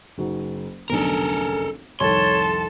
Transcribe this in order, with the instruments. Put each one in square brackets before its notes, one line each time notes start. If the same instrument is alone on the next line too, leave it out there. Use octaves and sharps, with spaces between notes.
[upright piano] F#1 D#4 F#4
[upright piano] F1 B1 D3 [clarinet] C#4 [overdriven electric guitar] A4 A#4
[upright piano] C2 F2 D#3 [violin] A4 A5 [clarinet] C#5 [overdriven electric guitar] C6